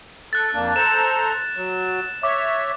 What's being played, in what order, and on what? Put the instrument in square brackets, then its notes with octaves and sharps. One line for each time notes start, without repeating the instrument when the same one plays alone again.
[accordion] A4 [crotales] F#6 A6
[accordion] F2 A#3 D4
[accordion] A4 C5 A#5 [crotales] E7
[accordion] F#3
[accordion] C#5 E5 [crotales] D6